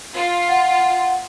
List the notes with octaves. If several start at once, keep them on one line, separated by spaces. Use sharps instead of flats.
F4
F#5